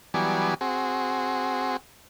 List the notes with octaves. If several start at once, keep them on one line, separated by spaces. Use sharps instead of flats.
E3 F#3 G3 B3 D5 G#5
C4 F#4 G#4